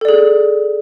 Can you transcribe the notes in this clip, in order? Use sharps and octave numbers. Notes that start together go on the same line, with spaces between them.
G#4 A4 D5